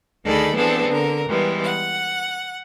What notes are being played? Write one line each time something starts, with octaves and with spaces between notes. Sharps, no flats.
D2 D#3 G#4 A4 D5 B5
E3 B3 C4 D4 G#4 A4
D3 A#4
E3 G3 G#3 B3
F#5